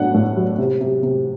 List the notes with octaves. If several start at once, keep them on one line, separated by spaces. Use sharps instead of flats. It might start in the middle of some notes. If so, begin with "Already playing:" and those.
Already playing: A2 F#3 D4 F#5
A2
F#3
C3
C3
C3